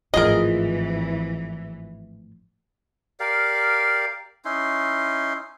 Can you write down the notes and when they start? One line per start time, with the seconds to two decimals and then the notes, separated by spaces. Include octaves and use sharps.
0.14 G#1 A2 E3 F3 F4 G#4 A#4 D#5
3.20 G4 A#4 D5 F5
4.45 C#4 D#4 E4 C6